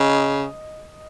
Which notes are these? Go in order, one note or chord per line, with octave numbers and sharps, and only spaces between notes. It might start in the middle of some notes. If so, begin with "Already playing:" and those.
Already playing: C#3 D#5